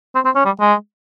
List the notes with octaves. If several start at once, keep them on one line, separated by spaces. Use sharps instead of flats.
C4
C4
C#4
G3
G#3